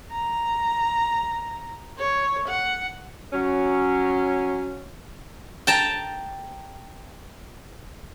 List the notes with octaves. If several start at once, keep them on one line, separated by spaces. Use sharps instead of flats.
A#5
C#5
F#5
F#3 C#4
G5 A5 A#5